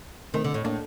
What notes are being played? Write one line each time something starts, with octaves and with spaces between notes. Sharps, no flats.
D#3 A3 C4
D3
A2
A2 A#3 D4